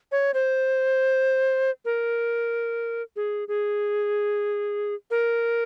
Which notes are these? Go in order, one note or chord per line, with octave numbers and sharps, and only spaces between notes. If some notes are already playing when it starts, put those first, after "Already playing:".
C#5
C5
A#4
G#4
G#4
A#4